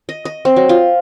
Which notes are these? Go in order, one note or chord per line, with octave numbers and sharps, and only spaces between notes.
D#5
D#5
C4
F#3
F4